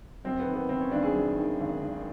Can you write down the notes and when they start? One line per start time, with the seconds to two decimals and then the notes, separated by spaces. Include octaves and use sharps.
0.25 F#2 C4
0.39 B3
0.46 D#3
0.54 B3
0.69 G#1 C4
0.81 C#4
0.91 G#1 D4
1.02 G#4
1.14 F#2
1.37 D#3
1.59 G#1
1.82 G#1